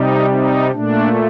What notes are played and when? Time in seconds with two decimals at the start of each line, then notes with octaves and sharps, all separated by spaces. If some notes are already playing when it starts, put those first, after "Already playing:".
Already playing: C3 G3 D#4
0.30 D#4
0.71 A#2 A3 D4